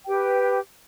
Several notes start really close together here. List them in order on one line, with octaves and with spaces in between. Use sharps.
G5 G4 B4